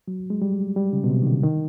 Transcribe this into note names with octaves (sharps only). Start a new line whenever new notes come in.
F#3
G#3
G3
G3
C#3
B2
C3
D#3
D3
D#3